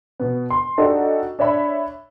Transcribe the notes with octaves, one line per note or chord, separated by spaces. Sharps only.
B2 B3
C6
D4 D#4 F#4 G4 A4
D4 C#5 E5 B5